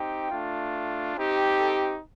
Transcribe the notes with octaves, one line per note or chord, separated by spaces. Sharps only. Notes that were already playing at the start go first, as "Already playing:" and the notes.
Already playing: C4 D#4 G4 G5
A3 D4 F4
C4 D#4 G4
A4